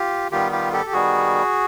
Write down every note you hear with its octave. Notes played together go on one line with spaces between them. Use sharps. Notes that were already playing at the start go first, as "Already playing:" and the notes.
Already playing: F4 G4
D#3 G3 B3 F4 G4
F4 G4
G4 A4
G4
D#3 G3 B3 F#4 G#4